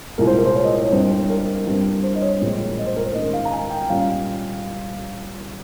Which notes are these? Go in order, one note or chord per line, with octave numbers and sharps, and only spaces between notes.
C2 A#2 G#3 A#4
C5
A#4
C5
C#5
D#5
C5
C#5
G2 G3 C4 C5
C5
A#4
G2 G3 C4
C5
D#5
C#5
A#1 A#2 G#3 C4
D#5
C5
A#4
C5
G#2 D#3 G#3 C#4 D#5
F5
A#5
G#5
G5
A#2 G3 C#4 F5